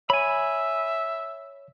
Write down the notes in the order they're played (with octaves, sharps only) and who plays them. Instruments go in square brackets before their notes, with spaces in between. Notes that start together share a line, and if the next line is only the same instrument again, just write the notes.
[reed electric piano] C#5 [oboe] E5 [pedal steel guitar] G#5 B5